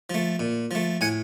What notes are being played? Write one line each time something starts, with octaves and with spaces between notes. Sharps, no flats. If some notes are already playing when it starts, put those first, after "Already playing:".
F3 A3
A#2
F3 A3
A2 F#5 G#5